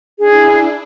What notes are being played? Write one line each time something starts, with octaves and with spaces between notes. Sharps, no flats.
D4 E4 G#4